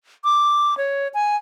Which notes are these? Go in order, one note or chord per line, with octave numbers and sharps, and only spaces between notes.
D6
C#5
G#5